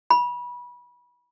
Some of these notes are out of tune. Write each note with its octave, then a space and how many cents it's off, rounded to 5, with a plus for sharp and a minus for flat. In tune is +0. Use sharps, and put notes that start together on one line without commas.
B5 -25